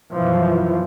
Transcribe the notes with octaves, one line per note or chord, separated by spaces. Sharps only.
F#2 B2 E3 F3